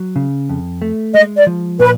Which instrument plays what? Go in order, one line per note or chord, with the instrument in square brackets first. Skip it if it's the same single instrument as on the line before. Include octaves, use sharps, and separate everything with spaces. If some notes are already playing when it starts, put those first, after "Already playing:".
Already playing: [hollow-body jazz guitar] F#3
C#3
F2
A3
[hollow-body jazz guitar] G#3 [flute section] D#5
[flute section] D5
[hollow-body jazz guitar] F3
[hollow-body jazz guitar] A#2 [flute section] B4